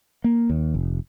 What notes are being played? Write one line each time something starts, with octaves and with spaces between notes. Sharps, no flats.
A#3
D#2
F1